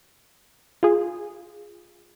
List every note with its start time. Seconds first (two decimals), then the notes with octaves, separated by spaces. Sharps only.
0.83 F4 G#4